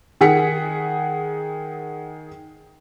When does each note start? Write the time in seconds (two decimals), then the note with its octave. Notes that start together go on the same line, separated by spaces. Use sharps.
0.21 D#3 G#4 F#5 B6 C#7